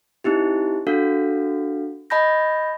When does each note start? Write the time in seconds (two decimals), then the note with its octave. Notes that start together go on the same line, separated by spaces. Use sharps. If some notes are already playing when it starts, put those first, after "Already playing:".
0.24 C4 D#4 E4 G4
0.87 D4 F#4 A4 F5
2.10 D#5 A5 B5 G6 A#6